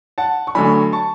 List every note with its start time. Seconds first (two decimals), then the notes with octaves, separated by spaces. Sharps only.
0.18 F#5 A5
0.47 C#6
0.55 D2 D3 F#3 G#5 B5
0.93 A5 C#6